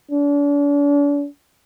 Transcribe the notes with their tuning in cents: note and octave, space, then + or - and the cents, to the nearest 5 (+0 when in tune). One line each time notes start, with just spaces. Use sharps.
D4 -40